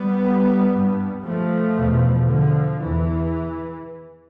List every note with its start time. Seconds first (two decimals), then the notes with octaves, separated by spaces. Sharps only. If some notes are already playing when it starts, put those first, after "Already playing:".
Already playing: G3 B3
0.72 G2
1.24 F3 A3
1.76 E2 B2
2.28 D3 F3
2.81 E2 E3